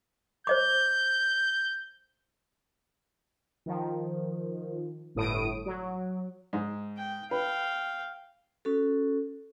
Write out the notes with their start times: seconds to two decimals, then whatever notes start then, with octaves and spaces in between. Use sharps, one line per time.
0.47 C5 D#5 D6 G6
3.66 D#3 F3
5.15 G1 A2 D#6 D7
5.66 F#3
6.53 G#2
6.97 G5
7.31 B4 F5 G5
8.65 C#4 F#4 A4